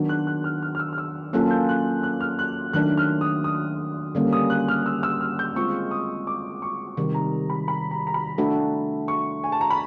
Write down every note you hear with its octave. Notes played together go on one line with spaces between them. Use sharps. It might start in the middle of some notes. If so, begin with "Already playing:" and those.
Already playing: D#3 F#3 B3 D4 F#4
F#6
F#6
F6
F6
F6
E6
F6
E6
F#3 A#3 C#4 F4 A4 F#6
G6
F#6
F#6
F6
F#6
D#3 F#3 A3 D4 F#6
F6
D#6
D#6
D3 G3 A#3 C#4
D#6
F#6
F6
E6
E6
F6
G6
G#3 C4 F4 C#6
D#6
D6
C#6
C3 D#3 G3
A#5
B5
B5
A#5
A#5
B5
A3 D4 F#4 A4
C#6
G#5
A5
A#5
B5